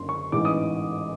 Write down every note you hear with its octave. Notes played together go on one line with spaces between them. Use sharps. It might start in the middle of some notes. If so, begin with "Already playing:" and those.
Already playing: F#1 F#2 D3 C6
C#6
A1 G#2 E3 D6
D#6